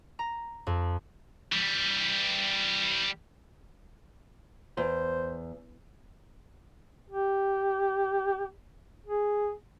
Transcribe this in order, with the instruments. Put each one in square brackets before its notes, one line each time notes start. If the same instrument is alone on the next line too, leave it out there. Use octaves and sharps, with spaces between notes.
[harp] A#5
F2
[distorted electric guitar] E3 G3
[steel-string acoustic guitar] E2 [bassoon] C5
[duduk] G4
G#4